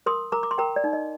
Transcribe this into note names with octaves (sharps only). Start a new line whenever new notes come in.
A#4 C6 D#6
A#4 A#5 D6
D6
C6
A#4 G5 A#5
D5
D#4
D#5